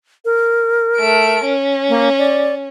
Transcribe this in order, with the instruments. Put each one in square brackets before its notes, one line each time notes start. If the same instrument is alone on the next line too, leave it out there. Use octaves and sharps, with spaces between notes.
[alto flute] A#4
[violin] A3 D7
C#4
[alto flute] A#3
D5